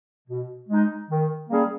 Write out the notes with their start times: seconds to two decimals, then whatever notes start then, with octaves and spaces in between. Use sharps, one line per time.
0.28 B2
0.69 G#3 D#4
1.09 D#3
1.49 G3 A#3 C#4 G#4